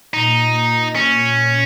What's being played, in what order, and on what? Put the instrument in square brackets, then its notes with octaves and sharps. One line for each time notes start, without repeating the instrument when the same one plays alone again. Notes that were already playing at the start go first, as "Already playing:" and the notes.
[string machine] A#2 [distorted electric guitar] D#4
[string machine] A#2 [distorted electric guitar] C#4